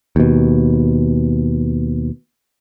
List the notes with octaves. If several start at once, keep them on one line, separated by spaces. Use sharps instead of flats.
D#2 B2